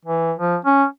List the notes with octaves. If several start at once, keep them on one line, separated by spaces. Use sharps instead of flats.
E3
F3
C#4